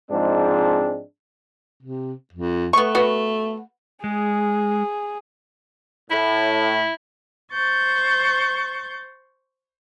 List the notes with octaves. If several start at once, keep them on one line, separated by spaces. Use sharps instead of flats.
G#2 F3 G#3 C4 D4
C3
F2
A3 B3 C#6
B3 F#4
G#3 G#4
A2 E4 E5
C5 C#6 G6 A6